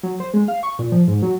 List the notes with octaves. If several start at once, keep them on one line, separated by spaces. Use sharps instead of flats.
F#3
C5
G#3
F5
C#6
A#2
F3
G#2
F#3